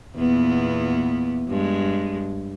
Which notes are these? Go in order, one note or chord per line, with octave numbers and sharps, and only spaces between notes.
E2 A#2 B3
G2 G#3